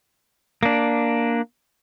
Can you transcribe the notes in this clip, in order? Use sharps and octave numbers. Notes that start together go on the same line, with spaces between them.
A#3 D4